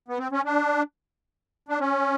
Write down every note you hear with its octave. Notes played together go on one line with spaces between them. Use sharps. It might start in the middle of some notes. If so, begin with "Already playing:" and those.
B3
C4
C#4
D4
D4
C#4